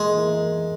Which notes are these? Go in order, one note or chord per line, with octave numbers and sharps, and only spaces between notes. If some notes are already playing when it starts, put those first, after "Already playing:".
Already playing: E3 G#3 A#3 E4 A#4
E3 A#3 E4 A#4